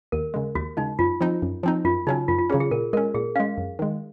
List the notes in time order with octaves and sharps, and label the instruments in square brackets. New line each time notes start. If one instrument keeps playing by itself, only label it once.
[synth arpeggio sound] D#2 [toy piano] A#4
[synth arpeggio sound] C#3 G#3
[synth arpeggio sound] D#2 [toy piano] F#4
[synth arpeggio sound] C#3 G#3 [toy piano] D#4
[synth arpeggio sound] F#2 [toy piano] F4
[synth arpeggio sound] F3 C4 D#4
F#2
F3 C4 D#4
[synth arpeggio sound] F#2 [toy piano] F4
[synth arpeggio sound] C#3 F#3 C#4 [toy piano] D#4
[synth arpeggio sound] F#2 [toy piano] F4
[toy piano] F4
[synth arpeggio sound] C#3 F#3 C#4 [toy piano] G#4
[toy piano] G#4
[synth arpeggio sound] A#2 [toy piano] A#4
[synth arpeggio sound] G#3 [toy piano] A#4
[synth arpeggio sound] C#4
[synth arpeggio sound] A#2 [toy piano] G#4
[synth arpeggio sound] G#3 C#4 [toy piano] F5
[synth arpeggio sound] F#2
D#3 G#3